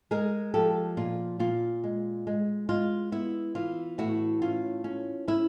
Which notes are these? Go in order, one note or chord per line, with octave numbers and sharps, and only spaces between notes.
G#3 G#4 A#4
F3 G4 A4
A#2 F4
A#2 F4
G#3
G#3
G#3 F4
B3 E4
E3 F4
A2 E4 F#4
C#4 F4
C#4
C#4 E4